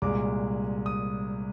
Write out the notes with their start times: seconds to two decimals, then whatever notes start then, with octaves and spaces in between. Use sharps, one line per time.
0.02 C2 A#2 G#3 D6
0.86 D#6